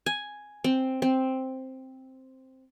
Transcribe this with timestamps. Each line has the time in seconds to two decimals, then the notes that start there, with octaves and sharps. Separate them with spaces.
0.06 G#5
0.64 C4
1.02 C4